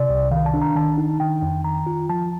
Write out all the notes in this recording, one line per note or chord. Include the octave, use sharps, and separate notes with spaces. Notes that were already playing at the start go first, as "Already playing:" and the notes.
Already playing: C3 D5
C2
D#3 F5
A5
D4
A#5
D#3 A5
D#4
D#3 G5
F2
D#3 A#5
F4
F3 A5